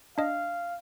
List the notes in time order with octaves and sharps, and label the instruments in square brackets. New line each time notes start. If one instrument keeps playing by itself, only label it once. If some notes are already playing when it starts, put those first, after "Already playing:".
[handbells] D4 D#5 [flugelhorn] F5